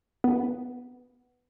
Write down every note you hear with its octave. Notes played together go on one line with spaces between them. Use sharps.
B3